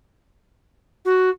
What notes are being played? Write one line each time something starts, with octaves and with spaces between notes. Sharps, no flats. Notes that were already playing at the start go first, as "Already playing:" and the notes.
F#4